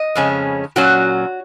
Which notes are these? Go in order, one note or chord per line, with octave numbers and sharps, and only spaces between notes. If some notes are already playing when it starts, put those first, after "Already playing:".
Already playing: D#5
F2 C#3 G#3 C#4
A#2 F#3 C#4 F#4